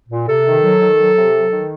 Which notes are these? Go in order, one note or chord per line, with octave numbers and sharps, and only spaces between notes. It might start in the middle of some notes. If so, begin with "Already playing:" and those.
A#2
C3 A4
D#3
F#3
D#3
F#3
C3
F#3
D#3